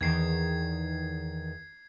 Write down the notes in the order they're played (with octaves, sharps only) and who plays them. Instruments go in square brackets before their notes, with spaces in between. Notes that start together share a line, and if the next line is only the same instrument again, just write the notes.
[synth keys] E2 D#3 [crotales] G#6 C7